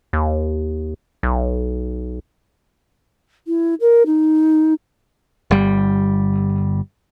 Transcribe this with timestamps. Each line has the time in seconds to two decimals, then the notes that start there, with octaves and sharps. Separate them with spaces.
0.13 D#2
1.23 B1
3.47 E4
3.80 A#4
4.06 D#4
5.51 G1 G3